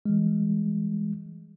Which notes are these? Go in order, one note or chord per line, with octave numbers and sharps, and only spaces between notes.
E3 G3 G#3